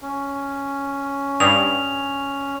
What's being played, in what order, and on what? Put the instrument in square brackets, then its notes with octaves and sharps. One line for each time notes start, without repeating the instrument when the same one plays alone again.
[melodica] C#4
[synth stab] G2 [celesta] D#6 [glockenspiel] F7